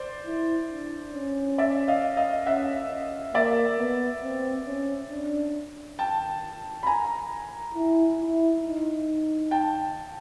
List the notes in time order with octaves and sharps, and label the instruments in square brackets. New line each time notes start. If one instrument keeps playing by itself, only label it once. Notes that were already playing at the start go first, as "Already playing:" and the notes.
Already playing: [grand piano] C5 D5
[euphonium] E4
D4
C#4
[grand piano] D5 E5
D#5 F5
D#5 F5
[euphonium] C#4 [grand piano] E5 F#5
[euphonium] A#3 [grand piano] D5 E5
[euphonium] B3
C4
C#4
D4
[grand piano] G5 A5
B5
G#5 A#5
[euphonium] E4
E4
D#4
[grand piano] G5 A5